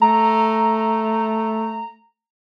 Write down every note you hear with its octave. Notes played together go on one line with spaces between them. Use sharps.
A3 A#5